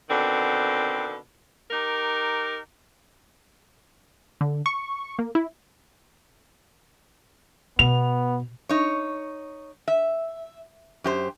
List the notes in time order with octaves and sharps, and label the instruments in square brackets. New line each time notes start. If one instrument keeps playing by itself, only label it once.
[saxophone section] B2 D3 D#3 C4
D#4 G4 A#4
[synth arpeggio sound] D3
C#6
A#3
E4
[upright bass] B2 [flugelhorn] B3 [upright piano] F7
[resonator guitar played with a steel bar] D#4 C#5
E5
F#2 G4 C5